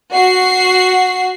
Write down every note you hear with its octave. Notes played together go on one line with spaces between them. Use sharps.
F#4 C7